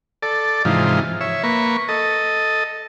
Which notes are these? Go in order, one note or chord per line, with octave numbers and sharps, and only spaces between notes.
A4 D5
G#2 C3 E3 F3 D#4 F4
C#5 E5
A#3 B4 C#6
A4 D#5